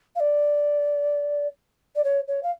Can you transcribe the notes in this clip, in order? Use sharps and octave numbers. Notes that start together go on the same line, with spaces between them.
F5
D5
D5
C#5
C#5
F5